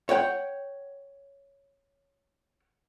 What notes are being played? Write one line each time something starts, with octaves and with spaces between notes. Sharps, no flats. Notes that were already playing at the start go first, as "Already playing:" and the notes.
C#5 F#5 G5